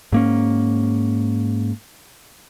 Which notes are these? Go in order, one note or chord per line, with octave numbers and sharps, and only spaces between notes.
G#2 A#3 C#4